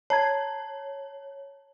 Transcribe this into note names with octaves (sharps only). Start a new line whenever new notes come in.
C#5 A5 A#5 G#6